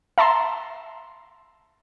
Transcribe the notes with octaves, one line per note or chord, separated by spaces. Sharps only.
E5 A5 A#5 C6